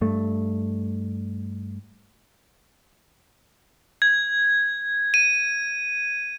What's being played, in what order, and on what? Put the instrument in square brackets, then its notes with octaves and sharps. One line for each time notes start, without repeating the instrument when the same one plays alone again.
[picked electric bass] G2 A3
[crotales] G#6
D#7